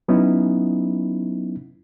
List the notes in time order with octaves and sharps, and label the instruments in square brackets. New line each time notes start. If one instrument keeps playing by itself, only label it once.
[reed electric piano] F#3 B3 C#4 D#4 E4